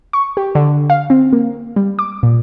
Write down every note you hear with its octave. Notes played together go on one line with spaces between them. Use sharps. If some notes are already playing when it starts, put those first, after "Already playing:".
C#6
G4
D3
F5
C4
A#3
G3
D6
A#2